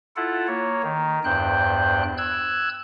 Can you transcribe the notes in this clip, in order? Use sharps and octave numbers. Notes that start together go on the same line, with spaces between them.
E4 F4 A4 F#5
A#3 C#5
D#3
E2 G2 C5 G5 F#6
E6 F#6 G#6